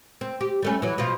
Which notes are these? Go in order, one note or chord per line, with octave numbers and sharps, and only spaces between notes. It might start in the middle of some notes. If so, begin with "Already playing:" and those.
C4
G4
G3 A3 C#4
E3 F#3
B2 F3 F4